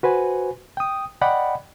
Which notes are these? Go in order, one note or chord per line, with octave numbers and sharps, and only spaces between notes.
F#4 B4 C5 G#5
G5 D#6
D5 D#5 F#5 G5 B5